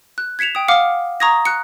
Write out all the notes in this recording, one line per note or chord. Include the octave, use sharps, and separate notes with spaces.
F#6
G#6 B6 C#7 E7 F7
G5 D#6
F5 F#5 D6 F6 C#7
A#5 C#6 D#6 G#6 A#6
F#6 C#7